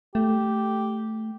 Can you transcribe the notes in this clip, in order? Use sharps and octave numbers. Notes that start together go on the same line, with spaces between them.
A3 G4